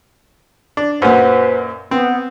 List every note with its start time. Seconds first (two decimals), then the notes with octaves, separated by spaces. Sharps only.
0.77 D4
1.02 F#2 A#2 F#4 B4 C5
1.91 B3 C4